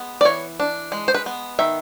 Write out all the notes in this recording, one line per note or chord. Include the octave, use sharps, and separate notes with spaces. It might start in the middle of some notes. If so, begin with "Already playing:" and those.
Already playing: G#3 B3
D5
E3 C#5
D4
G#3
C5
B4
B3
D#3 E5